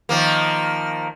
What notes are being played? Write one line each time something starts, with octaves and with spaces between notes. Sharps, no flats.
D#3 F3 A#3